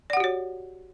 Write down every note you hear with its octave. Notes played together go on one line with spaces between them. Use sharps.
F#4 G4 C#5 D5 F#5